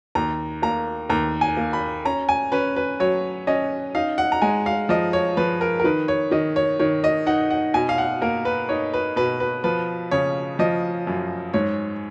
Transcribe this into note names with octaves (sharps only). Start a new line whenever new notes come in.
D#2 A#5
A#3 A#5
D#2 A#5
G#5
A#3
B5
C#4 A#5
G#5
C#4 B4
B4
F#3 C#5
C#4 D#5
D#4 F5
F#5
A#5
G#3 G#5
F5
F3 D#5
C#5
F3 B4
A#4
A#4
D#3 B4
C#5
D#3 D#5
C#5
D#3 C#5
D#5
D#4 F#5
F#5
B2 G#5
F5
F#5
A#3 A#4
B4
D#4 C#5
B4
B2 B4
B4
F3 B4
C#3 C#5
F3 D#5
F#2
G#2 C#5